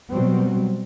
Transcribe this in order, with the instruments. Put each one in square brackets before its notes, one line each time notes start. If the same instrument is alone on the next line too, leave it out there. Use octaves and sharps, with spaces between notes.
[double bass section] B2 F#3 G3 B3 C4